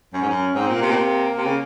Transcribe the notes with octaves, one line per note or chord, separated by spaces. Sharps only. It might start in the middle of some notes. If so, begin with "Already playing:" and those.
F#2 C#4
G#2
F#2
G#2 C4
A#2
A#3
C3
A#2
C3
C3
C#3